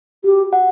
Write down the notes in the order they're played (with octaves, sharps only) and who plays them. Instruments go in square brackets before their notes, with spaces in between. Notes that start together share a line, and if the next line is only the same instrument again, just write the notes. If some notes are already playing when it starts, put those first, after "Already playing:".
[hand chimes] F#4 [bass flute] G4
[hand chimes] F#5